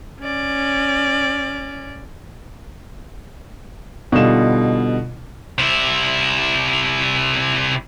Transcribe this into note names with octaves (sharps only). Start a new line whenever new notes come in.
C#4 D5
B2 D3 G3 D#4 F4 E7
C3 E4